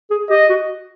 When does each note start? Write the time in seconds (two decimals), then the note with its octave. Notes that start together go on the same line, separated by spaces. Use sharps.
0.10 G#4
0.30 G4 D#5
0.49 F#4